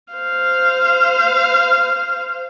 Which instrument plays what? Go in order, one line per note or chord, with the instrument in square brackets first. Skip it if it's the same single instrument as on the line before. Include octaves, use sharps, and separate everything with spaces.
[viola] C5 F5